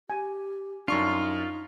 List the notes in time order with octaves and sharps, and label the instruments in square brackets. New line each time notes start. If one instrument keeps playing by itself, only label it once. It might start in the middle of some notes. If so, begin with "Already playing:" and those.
[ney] G4 [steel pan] G#5
[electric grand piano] F#2 C#6 C7 [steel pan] D4 [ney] D#4 [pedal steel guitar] F4